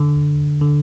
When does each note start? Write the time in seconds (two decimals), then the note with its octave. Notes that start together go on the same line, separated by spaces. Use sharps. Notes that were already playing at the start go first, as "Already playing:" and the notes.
Already playing: D3
0.61 D3